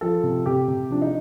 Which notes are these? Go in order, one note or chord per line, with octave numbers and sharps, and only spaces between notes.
F3 A4
C3
C3 G4
C3
F3 D4
D#4